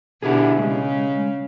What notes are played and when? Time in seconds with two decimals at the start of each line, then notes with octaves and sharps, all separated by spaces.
0.23 B2 D3 E4 G4 G#4
0.59 C#3 G#3